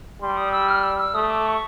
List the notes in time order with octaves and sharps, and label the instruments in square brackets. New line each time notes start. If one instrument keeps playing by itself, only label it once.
[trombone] G3 [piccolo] C6
[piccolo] D#6
E6
F6
E6
E6
[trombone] A3 [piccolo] D#6
[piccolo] D6
C#6